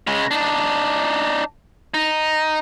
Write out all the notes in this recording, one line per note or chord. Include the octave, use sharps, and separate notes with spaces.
C#3 G#3
D4 D#4
D#4